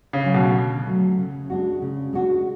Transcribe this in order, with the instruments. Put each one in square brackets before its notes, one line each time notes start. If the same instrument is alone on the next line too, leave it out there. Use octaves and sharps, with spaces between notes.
[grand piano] C#3
[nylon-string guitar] F#3 A3
[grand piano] B2
[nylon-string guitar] D3
F#3 A3
C#3
G#3 D4 F#4
C#3
G#3 D4 F#4